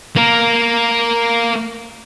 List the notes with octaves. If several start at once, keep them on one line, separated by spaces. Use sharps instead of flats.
A#3 A#4